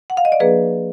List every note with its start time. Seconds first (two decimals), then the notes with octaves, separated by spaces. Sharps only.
0.10 F#5
0.17 F5
0.25 D#5
0.32 D5
0.40 F3 A#3 D4 G#4 B4